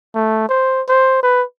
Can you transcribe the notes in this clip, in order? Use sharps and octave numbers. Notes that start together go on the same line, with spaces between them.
A3
C5
C5
B4